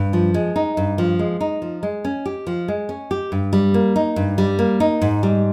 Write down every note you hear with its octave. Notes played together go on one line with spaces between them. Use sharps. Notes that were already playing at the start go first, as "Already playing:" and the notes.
Already playing: G2
F3
G#3
D#4
G2
F3
G#3
D#4
F3
G#3
C#4
G4
F3
G#3
C#4
G4
G2
G3
A#3
D#4
G2
G3
A#3
D#4
G#2
G3